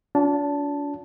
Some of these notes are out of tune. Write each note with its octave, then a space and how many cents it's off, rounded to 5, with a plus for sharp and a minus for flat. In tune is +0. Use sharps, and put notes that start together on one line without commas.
D4 -40 F4 +35 A5 +0